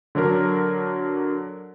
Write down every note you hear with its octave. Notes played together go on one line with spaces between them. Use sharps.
D3 F#3 D4 A#4